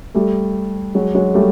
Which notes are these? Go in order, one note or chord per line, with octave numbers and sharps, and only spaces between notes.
G3 A3
F#3 G#3
F#3 G#3
G3 A3